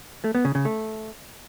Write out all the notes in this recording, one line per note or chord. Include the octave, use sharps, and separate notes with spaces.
A3
B3
C#3
C#3
A3